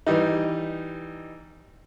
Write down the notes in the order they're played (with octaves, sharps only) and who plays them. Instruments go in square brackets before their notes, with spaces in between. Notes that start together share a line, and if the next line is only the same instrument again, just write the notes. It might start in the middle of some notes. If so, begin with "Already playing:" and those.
[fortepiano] E3 G3 D#4